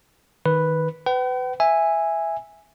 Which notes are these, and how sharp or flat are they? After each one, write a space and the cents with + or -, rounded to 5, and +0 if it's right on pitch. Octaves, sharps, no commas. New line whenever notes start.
D#3 +5 B4 +0
B4 +30 G5 -45
E5 +0 G#5 -10